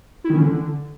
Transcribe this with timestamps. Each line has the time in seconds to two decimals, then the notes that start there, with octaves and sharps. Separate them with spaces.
0.24 E4
0.30 D#3
0.36 C#4
0.41 D3